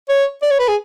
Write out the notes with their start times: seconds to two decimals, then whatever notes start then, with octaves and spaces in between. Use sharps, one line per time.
0.09 C#5
0.42 D5
0.51 C#5
0.60 B4
0.68 G#4